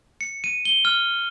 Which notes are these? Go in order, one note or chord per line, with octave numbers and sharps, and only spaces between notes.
C#7
D#7
G7
F6